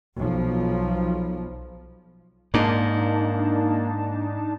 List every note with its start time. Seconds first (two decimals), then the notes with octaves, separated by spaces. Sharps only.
0.16 B1 F3
2.54 G#2 A#3 D4 D#4 A5